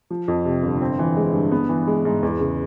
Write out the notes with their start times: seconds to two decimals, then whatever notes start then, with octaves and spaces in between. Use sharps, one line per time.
0.10 F3
0.28 F2
0.45 C3
0.63 G1
0.81 C4
0.99 E3
1.16 G#3
1.34 G2
1.52 B3
1.69 E3
1.87 G#3
2.05 G#2
2.23 E2
2.40 C#3